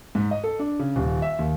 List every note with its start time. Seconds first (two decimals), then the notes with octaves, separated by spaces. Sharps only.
0.15 G#2
0.31 D#5
0.44 A4
0.59 D4
0.79 C#3
0.96 D#1
1.22 E5
1.39 D#2